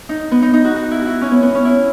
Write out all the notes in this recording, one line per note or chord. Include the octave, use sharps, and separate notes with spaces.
D#4
B3
D#4
D#4
F#4
F#4
E4
E4 F#4
C#4
B3
B3
C#4
E4